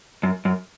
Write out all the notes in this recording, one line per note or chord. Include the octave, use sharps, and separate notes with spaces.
F#2
F#2